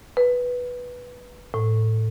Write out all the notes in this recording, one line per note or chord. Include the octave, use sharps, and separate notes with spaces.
B4
A2